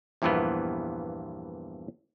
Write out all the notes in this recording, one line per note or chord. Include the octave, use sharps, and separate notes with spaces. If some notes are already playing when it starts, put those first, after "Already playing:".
E2 G2 A#2 E3 F3 B3